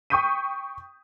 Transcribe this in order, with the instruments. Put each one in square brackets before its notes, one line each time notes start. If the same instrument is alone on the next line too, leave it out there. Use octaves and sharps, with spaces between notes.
[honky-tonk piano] G5 C#6 D#6 G6 B6 D#7